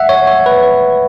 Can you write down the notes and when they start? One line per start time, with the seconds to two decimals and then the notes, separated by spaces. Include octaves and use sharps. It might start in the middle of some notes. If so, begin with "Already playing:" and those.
Already playing: E5 F#5
0.09 C#5
0.27 C#5
0.46 B4